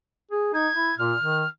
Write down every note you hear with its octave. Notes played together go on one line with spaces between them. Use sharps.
G#4
D#4 G#6
E4
A#2 F6
D#3